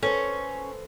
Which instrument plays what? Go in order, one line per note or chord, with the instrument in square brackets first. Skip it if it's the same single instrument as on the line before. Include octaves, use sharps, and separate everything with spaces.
[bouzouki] C#4 [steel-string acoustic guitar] A4 B4 C5